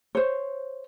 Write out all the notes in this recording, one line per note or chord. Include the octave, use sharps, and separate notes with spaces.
C5 C#5